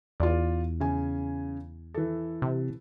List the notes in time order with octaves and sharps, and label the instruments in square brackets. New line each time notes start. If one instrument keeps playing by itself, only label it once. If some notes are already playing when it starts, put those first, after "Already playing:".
[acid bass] E2 [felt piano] F4 D5
[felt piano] C#3 G#5
E3 A4
[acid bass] C3